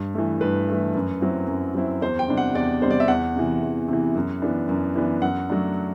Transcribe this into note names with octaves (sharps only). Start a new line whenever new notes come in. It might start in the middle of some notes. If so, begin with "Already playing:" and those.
Already playing: G2
E3 A3
G2 B4
E3 A3
F#2
F#3 C4 E4
F#2
F#3 C4 E4
E2 C5
G5
C3 G3 D4
F#5
E2 D5
C3 G3 D4 C5
D5
E5
E2 F#5
C3 E3
E2
C3 E3
F#2
E3 B3 D4
F#2
E3 B3 D4
F#2 F#5
F#3 A3 D4